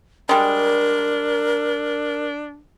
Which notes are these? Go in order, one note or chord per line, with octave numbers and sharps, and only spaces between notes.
G3 G#3 D4 A#4